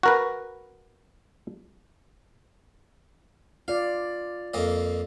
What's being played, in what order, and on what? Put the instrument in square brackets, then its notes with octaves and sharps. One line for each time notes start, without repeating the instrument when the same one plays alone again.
[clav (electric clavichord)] F#4 A#4 B4
[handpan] F4 D5 [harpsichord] F5
[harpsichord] F2 A#3 D#5